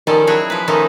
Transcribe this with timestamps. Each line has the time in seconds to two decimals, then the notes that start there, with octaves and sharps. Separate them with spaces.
0.07 D#3 F3 G3 C#4 A4
0.27 F#3 E4 F#4 G#4 C#5
0.50 F3 B4
0.68 D#3 F3 A3 C#4 D#4